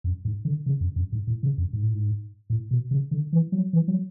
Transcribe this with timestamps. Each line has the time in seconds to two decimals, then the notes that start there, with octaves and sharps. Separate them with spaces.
0.04 F#2
0.25 G#2
0.45 D3
0.66 C#3
0.81 F#2
0.96 F#2
1.12 G#2
1.27 A2
1.43 C#3
1.58 F#2
1.73 G#2
1.83 A2
1.94 G#2
2.50 A2
2.71 B2
2.91 C#3
3.11 D3
3.33 E3
3.52 F#3
3.73 E3
3.88 F#3